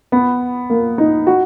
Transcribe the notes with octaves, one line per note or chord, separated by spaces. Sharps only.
B3
A#3
D#4
F#4